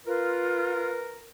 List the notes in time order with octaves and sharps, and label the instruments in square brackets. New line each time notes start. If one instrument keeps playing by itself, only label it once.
[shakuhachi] F4 [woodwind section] A#4 [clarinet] B4